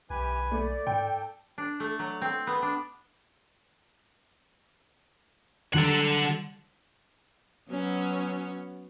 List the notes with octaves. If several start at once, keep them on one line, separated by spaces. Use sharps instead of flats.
B1 E3 G4 B4 G#5
A3 D5
G#2 A4 G5
D4
A3
F#3
C4
B3
D4
D3 F#3 A4 F#5
F#3 B3 C#4